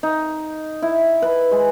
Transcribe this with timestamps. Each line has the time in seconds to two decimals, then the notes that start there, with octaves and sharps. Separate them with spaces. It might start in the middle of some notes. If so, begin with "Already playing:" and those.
0.03 D#4
0.82 E4
1.22 B4
1.51 G#3